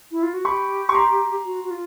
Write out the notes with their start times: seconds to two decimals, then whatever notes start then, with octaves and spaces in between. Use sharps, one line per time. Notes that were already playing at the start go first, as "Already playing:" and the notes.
0.11 E4
0.23 F4
0.34 F#4
0.45 G4 B5 C#6
0.89 C#6
0.95 A#5 C6
1.45 F#4
1.64 F#4
1.71 F4